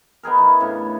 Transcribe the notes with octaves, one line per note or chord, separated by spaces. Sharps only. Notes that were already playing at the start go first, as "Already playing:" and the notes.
B3 D#4 G#4 A#4
E3
A2 C#3 D4 A4